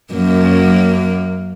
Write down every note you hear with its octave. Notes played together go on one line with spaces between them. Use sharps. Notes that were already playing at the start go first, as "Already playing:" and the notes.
F#2 A#3